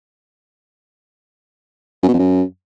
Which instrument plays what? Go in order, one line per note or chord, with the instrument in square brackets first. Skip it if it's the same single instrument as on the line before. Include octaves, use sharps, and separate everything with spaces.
[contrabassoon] F#2
B2
F2
F#2